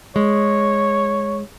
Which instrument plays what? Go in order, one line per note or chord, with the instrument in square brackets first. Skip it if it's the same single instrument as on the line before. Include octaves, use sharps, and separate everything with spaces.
[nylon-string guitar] G#3 [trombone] C#5